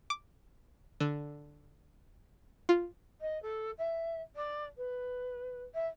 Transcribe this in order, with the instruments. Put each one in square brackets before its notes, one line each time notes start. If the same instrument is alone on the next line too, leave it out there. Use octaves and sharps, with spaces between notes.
[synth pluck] D6
D3
F4
[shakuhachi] D#5
A4
E5
D5
B4
E5